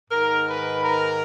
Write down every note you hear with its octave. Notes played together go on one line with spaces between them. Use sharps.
G#2 D#3 A#4
B4
A#4